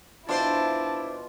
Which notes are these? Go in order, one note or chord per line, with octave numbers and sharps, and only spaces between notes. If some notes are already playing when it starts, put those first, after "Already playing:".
B2 D4 E4 F4 C5 A5